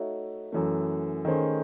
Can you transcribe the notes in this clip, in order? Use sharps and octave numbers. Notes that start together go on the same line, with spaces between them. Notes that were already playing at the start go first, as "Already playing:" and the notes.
Already playing: A3 D#4 F#4 C#5 E5
F#2 E3 A3
D#3 A3 C#4 G#4 C5